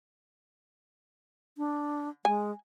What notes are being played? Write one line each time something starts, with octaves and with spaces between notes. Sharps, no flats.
D4
G#3 G#5